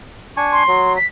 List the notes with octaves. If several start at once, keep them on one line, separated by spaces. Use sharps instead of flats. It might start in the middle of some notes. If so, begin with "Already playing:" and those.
D4 G#5 C#6
C6
F#3
B6